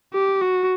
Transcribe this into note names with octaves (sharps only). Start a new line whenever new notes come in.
G4
F#4